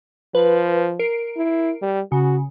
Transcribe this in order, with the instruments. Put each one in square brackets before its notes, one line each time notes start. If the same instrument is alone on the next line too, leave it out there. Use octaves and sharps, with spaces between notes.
[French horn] F3 [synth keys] B4
[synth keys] A#4 C7 D7
[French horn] E4
G3
[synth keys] C#3 [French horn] F#4